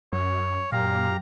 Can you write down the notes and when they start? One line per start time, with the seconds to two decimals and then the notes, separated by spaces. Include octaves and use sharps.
0.13 F#2 C#5
0.72 F#2 A#2 G4 F5 A#5